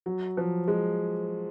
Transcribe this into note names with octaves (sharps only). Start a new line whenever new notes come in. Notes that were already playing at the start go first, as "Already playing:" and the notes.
F#3
F3
G#3